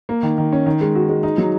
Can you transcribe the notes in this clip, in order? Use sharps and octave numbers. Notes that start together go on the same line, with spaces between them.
A#3
D#3
D#3
C#4
D#3
G#3
F#4
G#3
D#4
F#3